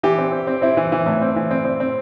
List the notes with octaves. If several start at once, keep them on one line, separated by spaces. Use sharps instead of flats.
E3 G4
C4
C4
C4
C4 E4
E3
E3
A2
C4
E3
C4
C4
C4